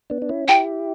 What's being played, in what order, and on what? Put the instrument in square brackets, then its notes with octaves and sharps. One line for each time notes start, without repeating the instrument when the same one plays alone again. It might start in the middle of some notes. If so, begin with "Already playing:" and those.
[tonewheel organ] B3 D4
D4
C#4 E4
[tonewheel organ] E4 G4 [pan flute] G5